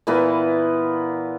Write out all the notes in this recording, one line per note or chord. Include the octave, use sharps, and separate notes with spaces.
A#2 E3 B3 A#4